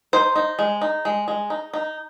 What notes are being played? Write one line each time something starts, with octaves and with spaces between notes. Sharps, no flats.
D#4 C5
D#4
G#3
D#4
G#3
G#3
D#4
D#4